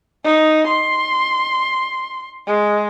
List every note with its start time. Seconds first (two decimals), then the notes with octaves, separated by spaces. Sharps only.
0.24 D#4
0.68 C6
2.47 G#3